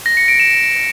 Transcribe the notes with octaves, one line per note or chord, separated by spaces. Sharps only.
A#6
C#7
D7
E7